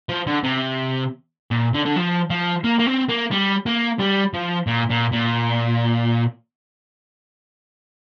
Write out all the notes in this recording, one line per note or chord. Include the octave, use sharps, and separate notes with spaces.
F3
D3
C3
A#2
D3
D3
F3
F3
A#3
A#3
C4
A#3
G3
A#3
G3
F3
A#2
A#2
A#2